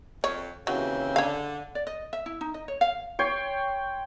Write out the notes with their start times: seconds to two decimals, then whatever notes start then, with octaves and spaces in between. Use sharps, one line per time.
0.24 F2 C#5
0.67 D#2 C#3 E3 F#3 C4
1.16 D3 C#5 F5
1.75 D5
1.87 D#5
2.13 E5
2.26 E4
2.41 D#4
2.54 D#5
2.68 C#5
2.81 F5
3.19 C#5 G5 C6